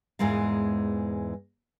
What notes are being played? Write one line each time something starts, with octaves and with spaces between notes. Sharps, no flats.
E2 G#2 E3 G#3 A#4 F5